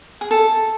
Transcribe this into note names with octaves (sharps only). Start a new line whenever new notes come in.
G#4
A4